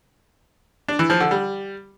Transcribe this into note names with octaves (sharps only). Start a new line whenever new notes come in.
D4
E3
F3
D3
G3